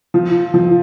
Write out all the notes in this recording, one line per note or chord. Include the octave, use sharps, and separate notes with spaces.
F3
F3